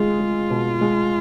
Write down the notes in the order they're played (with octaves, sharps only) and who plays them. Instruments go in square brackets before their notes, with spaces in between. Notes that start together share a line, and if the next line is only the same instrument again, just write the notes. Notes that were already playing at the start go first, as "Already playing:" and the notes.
Already playing: [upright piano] G#3 G#4 [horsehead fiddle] F4
[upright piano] G#3
B2
G#3